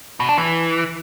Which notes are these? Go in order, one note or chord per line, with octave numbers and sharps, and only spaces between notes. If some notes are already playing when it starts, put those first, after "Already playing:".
B2
D4
E3